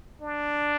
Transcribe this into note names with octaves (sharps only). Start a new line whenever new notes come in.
D4